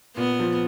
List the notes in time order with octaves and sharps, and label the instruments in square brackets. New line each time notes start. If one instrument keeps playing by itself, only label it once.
[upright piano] A#2 [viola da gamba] B3
[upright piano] F3